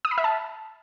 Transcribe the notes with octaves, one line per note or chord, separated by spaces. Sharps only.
D#6
B5
E5
A5